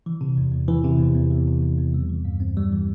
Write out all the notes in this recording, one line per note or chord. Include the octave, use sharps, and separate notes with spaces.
E3
C3
E2
E2
E3
C3
E2
E2
E3
C3
E2
E2
G3
E3
G2
C4
G3
E3